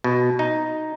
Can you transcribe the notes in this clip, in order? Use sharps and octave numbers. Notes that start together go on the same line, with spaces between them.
B2
D#4